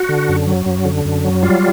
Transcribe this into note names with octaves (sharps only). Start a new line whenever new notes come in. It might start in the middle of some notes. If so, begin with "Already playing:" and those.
Already playing: F#4
D3
F#2
F#3
F#2
D3
F#2
F#3
G3 F4